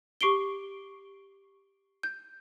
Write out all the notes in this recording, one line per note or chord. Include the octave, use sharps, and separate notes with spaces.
G4 C#6 C7 D7 G7
G6